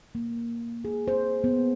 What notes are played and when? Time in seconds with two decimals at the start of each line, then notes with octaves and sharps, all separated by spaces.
0.15 A#3
0.85 G#4
1.08 C5
1.44 B3